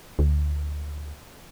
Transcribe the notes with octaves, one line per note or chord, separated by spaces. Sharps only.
D2